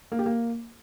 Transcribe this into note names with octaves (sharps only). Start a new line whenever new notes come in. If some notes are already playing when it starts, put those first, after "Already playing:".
A#3
G4
A#3